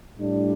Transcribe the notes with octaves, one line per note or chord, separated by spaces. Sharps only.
A2 G3 D4